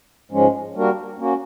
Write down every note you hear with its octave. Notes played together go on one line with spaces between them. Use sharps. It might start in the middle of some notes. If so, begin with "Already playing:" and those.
G#2 F3 G#3 C#4
G3 A#3 D4 F#4 A#4
A#3 C#4 F#4